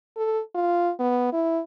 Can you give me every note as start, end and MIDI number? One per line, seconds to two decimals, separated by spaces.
0.17 0.40 69
0.55 0.91 65
1.00 1.32 59
1.33 1.60 64